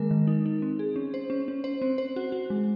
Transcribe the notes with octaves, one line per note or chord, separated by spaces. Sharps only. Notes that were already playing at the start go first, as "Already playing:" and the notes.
Already playing: D#3 G#3 A#3 A#4
D#3
D#4
D#4
C4
G#4
C#4
C5
C#4
C#4
C5
C4
C5
F#4
F#4
G#3